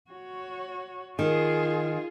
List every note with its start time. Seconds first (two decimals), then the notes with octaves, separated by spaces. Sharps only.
0.11 F#4 C#5
1.19 D#3 F4 G#4